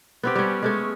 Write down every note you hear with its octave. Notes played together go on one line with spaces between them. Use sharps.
B3 C4 G4
G3 C#4
G#3 A3 C#4